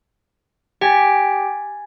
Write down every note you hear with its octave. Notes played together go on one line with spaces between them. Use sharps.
G4 G5 G#5 A6 B6